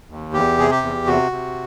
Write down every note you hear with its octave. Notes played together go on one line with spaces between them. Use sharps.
D#2
E2 G4
C3 G#4
G4
E2
C3 F#4
C3